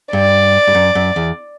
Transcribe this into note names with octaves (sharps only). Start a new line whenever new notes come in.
G2 D5
G2
F#2
F#2
E2